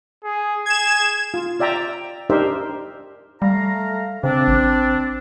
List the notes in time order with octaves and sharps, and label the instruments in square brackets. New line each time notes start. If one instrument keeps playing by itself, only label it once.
[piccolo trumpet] G#4
[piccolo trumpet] G#4 [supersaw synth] G#6 E7
[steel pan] F4
F4 D5 E5 G5 A#5
D4 D#4 G4 A#4 C5 E5
[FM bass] G3 [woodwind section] A3 F5 A#5
[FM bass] C#3 [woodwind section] C4 D4
[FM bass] A1